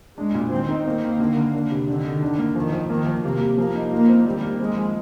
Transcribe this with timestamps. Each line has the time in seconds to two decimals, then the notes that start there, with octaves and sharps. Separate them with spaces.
0.18 G#3 D4
0.35 A#2
0.51 D#3 C4
0.69 D#4
0.86 A#3 C4
1.02 D#3
1.20 D3
1.37 D3
1.54 D4
1.71 C3
1.88 D3 D#3
2.04 D#3
2.22 D4
2.38 A#3
2.55 D#3 F3
2.72 F3
2.90 D#3 A#3
3.06 F3
3.23 C3 A#3
3.41 G3
3.58 F3 A#3
3.75 D#4
3.91 A#3 F4
4.09 C4
4.26 D#3 G3
4.42 A#3
4.59 G#3 C4
4.77 F3